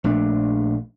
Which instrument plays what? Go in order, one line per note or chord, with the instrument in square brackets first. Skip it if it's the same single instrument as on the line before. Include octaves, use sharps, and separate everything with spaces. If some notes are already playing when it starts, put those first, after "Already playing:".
[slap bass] A#1 A3 D4